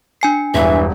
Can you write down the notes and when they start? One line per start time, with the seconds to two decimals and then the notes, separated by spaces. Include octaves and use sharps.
0.21 D4 G#5 C7
0.54 E1 G2 E3 E5